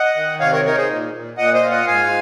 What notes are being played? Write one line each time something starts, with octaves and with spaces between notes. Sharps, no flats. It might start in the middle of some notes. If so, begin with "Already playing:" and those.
Already playing: D#5 F#5
D#3
C3 C#5 F5
A#4 C#5
D#4 A#4 C#5
G#4 C5
A#2
A#2
A#2 D#5 F#5
C5 D#5
F4
D#5 F#5
G#2 F5 G#5